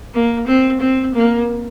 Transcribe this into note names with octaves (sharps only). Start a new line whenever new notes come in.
A#3
C4
C4
A#3